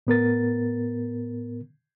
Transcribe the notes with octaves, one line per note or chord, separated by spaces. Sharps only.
A2 B3 A#4 A6